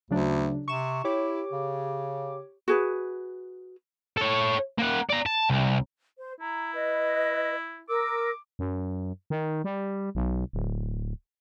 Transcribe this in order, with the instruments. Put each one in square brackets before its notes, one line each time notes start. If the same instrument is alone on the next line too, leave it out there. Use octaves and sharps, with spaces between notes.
[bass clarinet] D2 [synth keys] C#3 F#3 D4
[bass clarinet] C3 [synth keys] C#6 E7
[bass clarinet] E4 [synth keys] G4 C#5 D6
[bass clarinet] C#3
[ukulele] F#4 G#4 B4
[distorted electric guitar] A4 C#5
A#3 F#5
D5 A#5
A5
C2
[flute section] C5
[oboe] E4 [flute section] A#5
[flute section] B4 D#5
[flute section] A#4 E6 [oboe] D6
[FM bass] F#2
D#3
G3
B1
D1